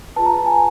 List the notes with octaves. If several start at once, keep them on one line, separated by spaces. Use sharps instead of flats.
F4 G#4 B4 A5
A#5
A5
G#5